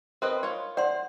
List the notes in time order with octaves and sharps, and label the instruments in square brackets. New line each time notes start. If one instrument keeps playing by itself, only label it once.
[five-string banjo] C4 B4 D#5 [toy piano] A#4
[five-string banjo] F4 C#5
[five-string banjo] C5 [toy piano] D5 F#5 C6